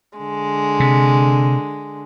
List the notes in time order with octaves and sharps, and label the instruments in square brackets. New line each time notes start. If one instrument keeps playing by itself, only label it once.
[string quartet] D3 G#3
[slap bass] C3